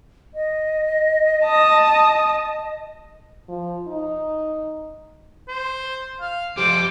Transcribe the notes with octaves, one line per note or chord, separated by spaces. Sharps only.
D#5
A5 D#6
F3
D#4
C5
F5
F3 G4 C5 D6